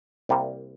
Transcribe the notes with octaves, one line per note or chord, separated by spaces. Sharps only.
C2 C3 G3 A#3